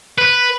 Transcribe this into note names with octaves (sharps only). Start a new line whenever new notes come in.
B4